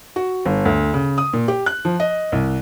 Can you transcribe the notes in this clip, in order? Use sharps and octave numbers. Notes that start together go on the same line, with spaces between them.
F#4
G1
D2
C#3
D#6
A#2
G4
F#6
F3
D#5
C2